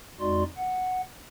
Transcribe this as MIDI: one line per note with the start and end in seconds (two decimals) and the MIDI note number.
0.20 0.43 41
0.20 0.43 56
0.20 0.43 63
0.20 0.43 66
0.20 0.43 74
0.20 0.43 84
0.56 1.01 78